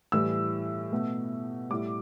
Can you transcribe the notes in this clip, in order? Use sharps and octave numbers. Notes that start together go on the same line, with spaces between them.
A2 E3 G3 E6
B2 A3
A2 G3 D6